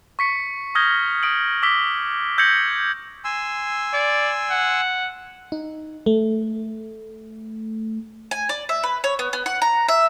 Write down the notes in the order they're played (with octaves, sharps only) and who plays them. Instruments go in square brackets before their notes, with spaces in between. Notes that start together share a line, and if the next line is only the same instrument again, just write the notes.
[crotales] C#6 B6 C#7
D#6 F6 G6 G#6 A#6 G7
D#6 D7 F#7
D6 E6 B6 G7
E6 G6 G#6 A#6 C#7 F#7
[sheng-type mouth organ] G#5 C6 E6
[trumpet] D5
F#5
[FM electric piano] D#4
A3
[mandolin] G#5
D5
E5
B4
C#5
B3
B3
F#5
A#5
E5